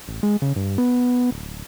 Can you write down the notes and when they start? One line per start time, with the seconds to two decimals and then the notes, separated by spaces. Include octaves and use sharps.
0.08 A1
0.23 G#3
0.42 C#3
0.56 G2
0.78 B3
1.31 D1